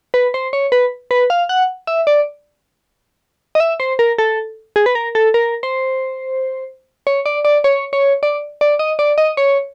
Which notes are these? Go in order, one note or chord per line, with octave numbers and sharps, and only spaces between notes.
B4
C5
C#5
B4
B4
F5
F#5
E5
D5
D#5
E5
C5
A#4
A4
G#4
B4
A#4
A4
A#4
C5
C#5
D5
D5
C#5
C#5
D5
D5
D#5
D5
D#5
C#5